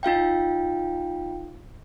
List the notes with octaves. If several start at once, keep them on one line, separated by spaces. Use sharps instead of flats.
D#4 F4 F5 G5